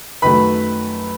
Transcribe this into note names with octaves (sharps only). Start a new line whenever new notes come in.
F#2 D#3 F#3 A3 B4 B5